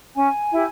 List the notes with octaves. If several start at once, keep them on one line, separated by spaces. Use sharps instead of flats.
C#4 G#5
E4 G4